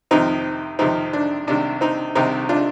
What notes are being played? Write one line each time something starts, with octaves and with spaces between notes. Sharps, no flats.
F2 C3 D#3 C4 D#4
F2 C3 D#3 C4 D#4
D4
C2 C3 D#3 D4
C4 D#4
C2 C3 D#3 C4 D#4
D4 F4